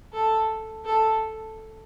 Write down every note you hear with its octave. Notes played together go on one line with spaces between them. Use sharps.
A4
A4